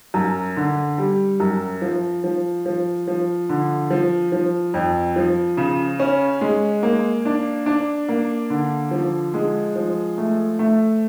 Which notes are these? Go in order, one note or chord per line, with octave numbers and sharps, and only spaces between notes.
F#2
D3
G3
F#2
F3
F3
F3
F3
D3
F3
F3
F2
F3
C#3
C#4
G#3
A#3
D4
D4
A#3
D3
F3
G#3
F3
A3
A3